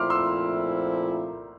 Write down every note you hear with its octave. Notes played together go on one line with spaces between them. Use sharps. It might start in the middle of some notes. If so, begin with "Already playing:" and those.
Already playing: A#2 F3 A3 C4 E4 C6 D6 F6
C6 E6